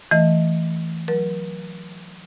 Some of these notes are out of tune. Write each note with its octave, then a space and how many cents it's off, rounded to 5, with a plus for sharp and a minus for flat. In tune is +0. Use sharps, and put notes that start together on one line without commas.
E3 +0 A3 +0 D#5 +0
F#3 -15 A#4 +45